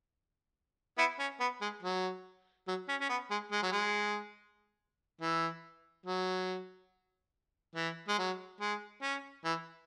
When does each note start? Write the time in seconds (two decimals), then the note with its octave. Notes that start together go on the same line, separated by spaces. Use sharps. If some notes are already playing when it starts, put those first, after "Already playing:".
0.98 B3 E4
1.19 C#4
1.40 B3
1.61 G#3
1.83 F#3
2.68 F#3
2.89 C#4
3.00 C#4
3.10 B3
3.30 G#3
3.52 G#3
3.62 F#3
3.72 G#3
5.21 E3
6.06 F#3
7.75 E3
8.08 G#3
8.18 F#3
8.60 G#3
9.02 C#4
9.44 E3